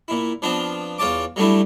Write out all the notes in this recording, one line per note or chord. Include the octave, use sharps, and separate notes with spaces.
A#2 E4
F3 B3 C4 D4 F4
E2 F4 C#5 A5 D6
F#3 G3 A3 D4 E4